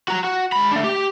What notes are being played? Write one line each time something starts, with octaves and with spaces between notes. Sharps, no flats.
F#4 A#5
F#4
G#3 B5
A3 D4
G4